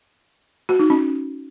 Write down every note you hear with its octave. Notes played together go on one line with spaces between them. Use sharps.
F#4
D#4
C#4